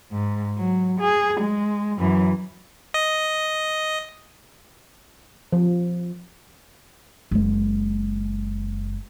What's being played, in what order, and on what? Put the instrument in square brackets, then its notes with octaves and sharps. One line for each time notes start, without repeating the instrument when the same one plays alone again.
[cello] G#2
F#3
G#4
G#3
F#2 E3
[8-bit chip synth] D#5
[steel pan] F3
[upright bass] F#1 G#3